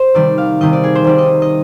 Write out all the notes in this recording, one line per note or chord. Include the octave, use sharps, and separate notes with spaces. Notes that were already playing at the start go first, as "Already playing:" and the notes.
Already playing: C5
C3 D#3 G3 D5
F5
C3 D#3 G3 D#5
D5
G#4
C5
C3 D#3 G3 D5
D#5
D#5